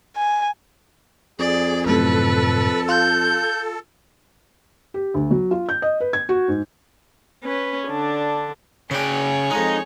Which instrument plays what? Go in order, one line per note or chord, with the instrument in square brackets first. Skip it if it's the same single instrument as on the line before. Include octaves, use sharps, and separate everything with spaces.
[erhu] G#5
[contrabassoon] F2 [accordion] G#4 [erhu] D5
[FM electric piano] F#2 A2 C3 [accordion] A4 [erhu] B4
[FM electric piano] F4 [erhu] G6
[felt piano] G4
D2
F#3
F4
G6
D#5
B4
G#6
F#4
G#2
[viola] C#4 B4
D3 D4
[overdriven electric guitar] C#3 G5 [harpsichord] C#4 D4 [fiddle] G#4 C#5
[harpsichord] F2 G#3 [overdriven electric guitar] D#4